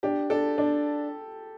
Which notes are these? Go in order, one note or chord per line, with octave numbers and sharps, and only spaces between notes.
D4 G4
D4 A4
D4